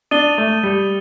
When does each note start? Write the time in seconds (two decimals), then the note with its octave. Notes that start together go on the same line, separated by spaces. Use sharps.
0.11 D4 D#6 A6 D#7 G7
0.38 A3
0.63 G3